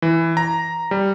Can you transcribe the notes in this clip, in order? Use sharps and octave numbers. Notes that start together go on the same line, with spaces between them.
E3
A#5
G3